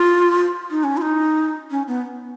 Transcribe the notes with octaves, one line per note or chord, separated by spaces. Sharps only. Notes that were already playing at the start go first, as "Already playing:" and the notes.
Already playing: F4
D#4
C#4
F4
D#4
C#4
B3